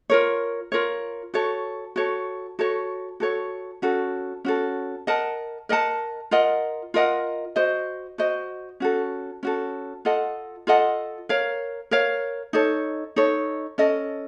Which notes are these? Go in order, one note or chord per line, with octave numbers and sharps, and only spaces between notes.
F4 A#4 C#5
F4 A#4 C#5
F#4 A4 C#5
F#4 A4 C#5
F#4 A4 C#5
F#4 A4 C#5
C#4 F#4 A4
C#4 F#4 A4
A#4 D#5 F#5 A5
A#4 D#5 F#5 A5
F4 A#4 D#5 F#5
F4 A#4 D#5 F#5
F#4 C5 D#5
F#4 C5 D#5
C#4 F#4 A4
C#4 F#4 A4
F4 A4 D#5 F#5
F4 A4 D#5 F#5
A#4 C#5 F5
A#4 C#5 F5
D#4 A4 C#5
D#4 A4 C#5
C#4 A4 D#5